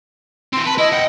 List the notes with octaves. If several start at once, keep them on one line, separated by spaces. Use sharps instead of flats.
E3 C4 C6
B4 A5
E4 D#5
F#5 G5